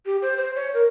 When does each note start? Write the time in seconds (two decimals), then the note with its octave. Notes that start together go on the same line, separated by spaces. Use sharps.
0.06 G4
0.22 C5
0.37 C5
0.56 C#5
0.74 A#4